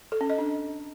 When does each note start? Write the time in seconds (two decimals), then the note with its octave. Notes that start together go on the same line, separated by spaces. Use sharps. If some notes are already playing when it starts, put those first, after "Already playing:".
0.12 A4
0.21 C#4
0.30 D#5
0.38 D4